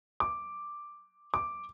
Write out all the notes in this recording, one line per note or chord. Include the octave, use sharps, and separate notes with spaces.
D6
D6